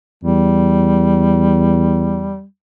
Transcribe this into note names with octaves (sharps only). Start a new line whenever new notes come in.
E2 G3